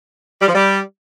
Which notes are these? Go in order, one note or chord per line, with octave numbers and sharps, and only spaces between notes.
G3
F3
G3